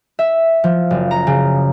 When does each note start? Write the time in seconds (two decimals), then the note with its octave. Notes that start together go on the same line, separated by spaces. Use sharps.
0.19 E5
0.64 F3
0.90 F#1
1.11 A#5
1.27 C#3